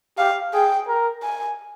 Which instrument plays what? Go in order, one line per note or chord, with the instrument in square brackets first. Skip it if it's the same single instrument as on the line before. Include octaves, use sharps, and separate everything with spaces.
[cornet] G4 [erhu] F5
[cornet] G#4 [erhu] G5
[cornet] A#4
[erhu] G#5